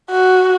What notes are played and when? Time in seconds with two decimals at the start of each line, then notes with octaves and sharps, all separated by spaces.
0.11 F#4